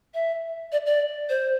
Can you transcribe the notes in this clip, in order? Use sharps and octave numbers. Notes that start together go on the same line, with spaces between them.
E5
D5
D5
C5